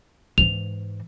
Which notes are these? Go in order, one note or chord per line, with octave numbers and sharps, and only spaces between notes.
G#2 E3 F7